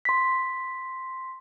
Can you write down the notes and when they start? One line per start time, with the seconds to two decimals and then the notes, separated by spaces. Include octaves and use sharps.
0.05 C6 B6